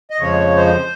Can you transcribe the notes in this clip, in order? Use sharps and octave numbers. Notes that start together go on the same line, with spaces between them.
D#5
F2 C#3 F3 G#3 C#5
C5